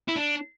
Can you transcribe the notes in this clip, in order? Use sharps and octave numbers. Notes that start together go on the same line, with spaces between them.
E4
D4